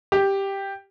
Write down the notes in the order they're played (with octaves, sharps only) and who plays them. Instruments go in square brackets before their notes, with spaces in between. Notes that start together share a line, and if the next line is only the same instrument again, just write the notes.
[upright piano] G4